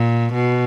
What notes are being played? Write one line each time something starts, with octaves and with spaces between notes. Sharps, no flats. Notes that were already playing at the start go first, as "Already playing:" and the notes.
Already playing: A#2
B2